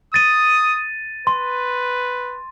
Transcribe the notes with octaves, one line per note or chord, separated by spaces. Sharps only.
D#6 A6 D#7
B4 C6